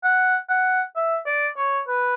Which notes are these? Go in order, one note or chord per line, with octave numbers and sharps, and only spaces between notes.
F#5
F#5
E5
D5
C#5
B4